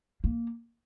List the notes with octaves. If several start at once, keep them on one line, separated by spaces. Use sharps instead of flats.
A#3